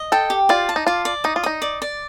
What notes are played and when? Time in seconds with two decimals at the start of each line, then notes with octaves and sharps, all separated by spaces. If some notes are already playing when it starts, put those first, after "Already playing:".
Already playing: D#5
0.12 A4 G5
0.30 G4
0.49 F4 D5
0.69 A5
0.76 D#4
0.87 F4 D5
1.05 D5
1.24 D#4 D#6
1.36 F4
1.43 D#4 D#6
1.62 D5
1.82 D5